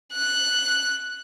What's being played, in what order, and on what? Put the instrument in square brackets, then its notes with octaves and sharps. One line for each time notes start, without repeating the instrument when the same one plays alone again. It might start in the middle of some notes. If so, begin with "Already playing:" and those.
[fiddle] F#6